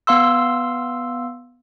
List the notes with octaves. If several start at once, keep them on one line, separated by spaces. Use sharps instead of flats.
B3 F5 C6 E6